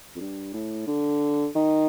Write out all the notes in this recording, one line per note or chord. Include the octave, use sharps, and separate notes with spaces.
F2
G2
A2
D3
D#3